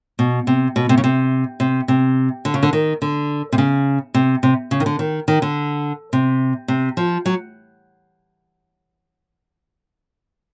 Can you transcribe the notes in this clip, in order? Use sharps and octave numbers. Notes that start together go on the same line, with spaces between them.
B2
C3
B2
C3
C#3
C3
C3
C3
D3
C#3
D3
D#3
D3
C3
C#3
C3
C3
C#3
D#3
D3
D#3
D#3
D3
C3
C3
F3
F#3